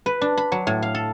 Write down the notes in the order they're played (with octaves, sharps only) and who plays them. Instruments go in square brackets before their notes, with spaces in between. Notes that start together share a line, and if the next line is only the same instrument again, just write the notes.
[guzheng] B4
D4
B5
F#3
A2
F5
A4